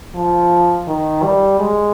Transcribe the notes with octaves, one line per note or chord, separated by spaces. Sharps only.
F3
D#3
G3
G#3